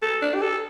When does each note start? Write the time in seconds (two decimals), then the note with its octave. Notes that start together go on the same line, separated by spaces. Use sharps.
0.02 A4
0.22 D4
0.35 G4
0.42 A4